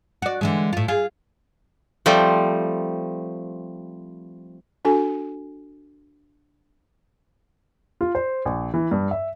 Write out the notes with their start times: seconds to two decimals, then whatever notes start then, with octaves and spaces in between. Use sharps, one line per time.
0.22 F#4 D5
0.41 D3 E3 G#3
0.73 A2 F4
0.88 F4 G#4
2.06 F3 G3 A3 C4
4.85 D4 F#4 A4 G#5
8.01 F4
8.15 C5
8.45 A#1
8.74 E3
8.91 G2
9.11 E5